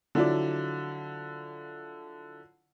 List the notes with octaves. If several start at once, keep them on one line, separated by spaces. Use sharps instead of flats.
D3 F3 F#3 E4 F4 D5